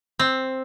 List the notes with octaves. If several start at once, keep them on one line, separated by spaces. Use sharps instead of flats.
C4